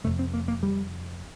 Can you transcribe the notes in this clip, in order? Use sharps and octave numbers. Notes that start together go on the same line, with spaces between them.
F2 C3 A3
C4
A#3
A#3
G3